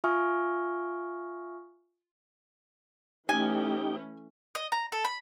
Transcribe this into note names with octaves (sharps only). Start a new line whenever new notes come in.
F4 E5 G#5 C#6 D#6 F6
E3 A3 C#4 D#4 G4 G5 G#5
D#5
A#5
A4
B5